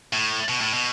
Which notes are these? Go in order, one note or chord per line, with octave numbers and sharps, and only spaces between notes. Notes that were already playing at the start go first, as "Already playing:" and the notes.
A2
B2
A2
B2